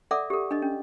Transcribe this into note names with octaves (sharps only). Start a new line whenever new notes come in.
A4 D5 E5 F#5 D6
G4 A4
D4 D#5
C#4